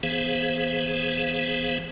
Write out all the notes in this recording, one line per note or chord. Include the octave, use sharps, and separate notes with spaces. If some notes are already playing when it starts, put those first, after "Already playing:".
E3 B3 G#4 C5 F5